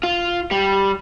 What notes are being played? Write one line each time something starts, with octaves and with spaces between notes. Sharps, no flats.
F4
G3